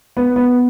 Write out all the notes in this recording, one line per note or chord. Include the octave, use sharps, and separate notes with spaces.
B3
B3